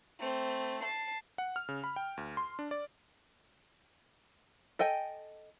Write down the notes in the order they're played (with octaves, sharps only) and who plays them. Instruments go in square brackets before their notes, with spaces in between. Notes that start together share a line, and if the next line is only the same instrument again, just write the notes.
[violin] A3 C4
A5 C7
[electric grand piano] F#5
F6
C#3
B5
G5
D2
C6
D4
D5
[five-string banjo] A4 D#5 G5 G#5